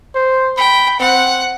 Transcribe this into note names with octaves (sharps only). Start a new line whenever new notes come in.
C5
G5 B5
C4 F#5